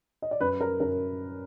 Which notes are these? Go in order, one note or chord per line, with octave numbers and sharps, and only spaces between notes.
D#5
D5
F#2 B4
A#4
F#2 A#4